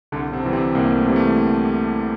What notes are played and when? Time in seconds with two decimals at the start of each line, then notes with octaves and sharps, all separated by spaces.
0.12 C2 D3 D4
0.32 C3 C4
0.43 C3
0.46 E3 G3
0.53 C3 C4
0.75 C2 A#3
0.95 A3
1.06 C3 E3 G3
1.16 A3